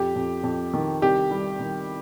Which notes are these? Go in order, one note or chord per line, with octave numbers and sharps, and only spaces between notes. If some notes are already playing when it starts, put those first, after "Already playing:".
Already playing: F2 G4
F2
F2
D#3
C2 G4
G3
D#3